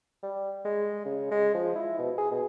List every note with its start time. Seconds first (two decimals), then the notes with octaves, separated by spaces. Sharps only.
0.23 G3
0.65 G#3
1.05 C#3
1.31 G#3
1.54 F3
1.75 E4
1.99 B2
2.18 G#4
2.31 B2